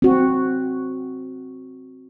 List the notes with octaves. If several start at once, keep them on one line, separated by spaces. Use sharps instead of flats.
C4 F#4